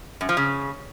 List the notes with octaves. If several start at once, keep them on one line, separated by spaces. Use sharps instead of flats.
F#2
F3
C#3